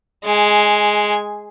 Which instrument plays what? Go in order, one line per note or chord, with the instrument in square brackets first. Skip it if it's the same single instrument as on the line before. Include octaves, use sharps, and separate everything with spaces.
[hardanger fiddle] G#3 G#5